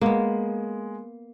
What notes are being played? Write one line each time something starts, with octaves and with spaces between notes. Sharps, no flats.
G#3 A#3 B3